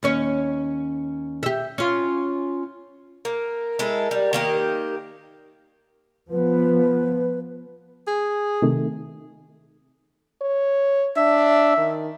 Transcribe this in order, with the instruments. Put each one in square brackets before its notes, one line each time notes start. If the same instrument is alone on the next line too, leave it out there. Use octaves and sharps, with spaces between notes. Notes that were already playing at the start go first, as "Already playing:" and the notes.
[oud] D#2 C#4 C#5
G4 E5
C#4 F4
[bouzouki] A#3 [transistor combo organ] A#4
[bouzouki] G#3 E4 A4
G3
D#3 A#3 G4
[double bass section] F3 B3 [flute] B4
[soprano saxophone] G#4
[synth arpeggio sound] C3 D#3 A3
[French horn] C#5
[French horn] D4 [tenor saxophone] E5
[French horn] D#3